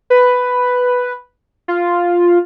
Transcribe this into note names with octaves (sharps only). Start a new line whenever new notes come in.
B4
F4